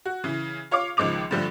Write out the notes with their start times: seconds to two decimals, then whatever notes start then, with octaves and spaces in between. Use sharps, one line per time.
0.05 F#4
0.24 C#3 E3
0.71 F4 C#5 F5 D6
0.97 C#2 D#3 F3 G#3 D6 F7
1.31 G2 D3 F3 G3 A3